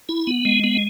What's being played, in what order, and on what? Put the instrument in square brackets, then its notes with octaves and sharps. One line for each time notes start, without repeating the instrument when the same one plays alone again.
[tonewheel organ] E4
B3
G#3
B3